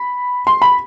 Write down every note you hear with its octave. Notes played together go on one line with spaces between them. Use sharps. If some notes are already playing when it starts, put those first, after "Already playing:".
Already playing: B5
C6
B5